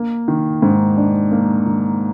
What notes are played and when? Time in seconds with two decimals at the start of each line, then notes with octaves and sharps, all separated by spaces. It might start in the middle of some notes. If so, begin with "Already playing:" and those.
Already playing: A#3
0.28 D#3
0.62 G#2
0.97 D4
1.32 A#3
1.66 D#3